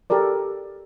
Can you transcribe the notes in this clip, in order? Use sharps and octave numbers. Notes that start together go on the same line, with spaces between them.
G4 A4 A#4 D5